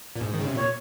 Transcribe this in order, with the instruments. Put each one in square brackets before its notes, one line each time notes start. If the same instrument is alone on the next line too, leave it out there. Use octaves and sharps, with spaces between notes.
[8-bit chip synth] A#2
G#2
D#3
C#3
C3
[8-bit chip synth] A#2 [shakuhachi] C#5